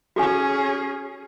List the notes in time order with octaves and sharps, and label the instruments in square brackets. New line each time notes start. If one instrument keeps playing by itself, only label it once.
[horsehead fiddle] C#4 G#4 [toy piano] F#4 A4 G#5